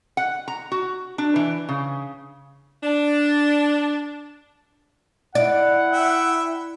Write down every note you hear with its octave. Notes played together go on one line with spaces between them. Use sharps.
F#5
A#5
F#4
D4
E3
C#3
D4
E4 D5 F#5
E5 G5